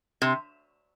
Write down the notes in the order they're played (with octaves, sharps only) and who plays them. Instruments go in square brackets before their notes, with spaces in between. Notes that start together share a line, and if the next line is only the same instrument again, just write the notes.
[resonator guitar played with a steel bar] C3